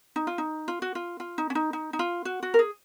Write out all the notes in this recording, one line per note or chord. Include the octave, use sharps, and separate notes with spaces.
D#4
F4
D#4
F4
F#4
F4
F4
D#4
C#4
D#4
D#4
D#4
F4
F#4
F#4
A#4
G#4